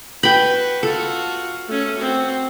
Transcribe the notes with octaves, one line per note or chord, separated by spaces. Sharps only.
F#4 B4 G5 B5
F4 F#4 A4
A3 C#4
C4 F#4